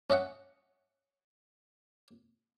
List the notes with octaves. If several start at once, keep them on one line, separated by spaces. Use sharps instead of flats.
C#4 D#5 E5 F#5